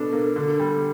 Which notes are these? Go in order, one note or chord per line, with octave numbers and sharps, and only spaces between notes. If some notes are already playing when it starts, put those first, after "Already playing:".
Already playing: B2 D4 A4
A#3
D3 A4
G3